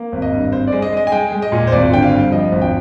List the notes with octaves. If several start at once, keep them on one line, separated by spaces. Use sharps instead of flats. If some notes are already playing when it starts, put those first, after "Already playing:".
Already playing: A#3
G#1
D#5
G2
C4 C5
G#3 D5
D#5
G#3 D#5
G#5
G#3 G5
G#3
D#5
A#2
C5
G#1 D5
D3 G5
F5
G2
F3 D#5
G#1
G5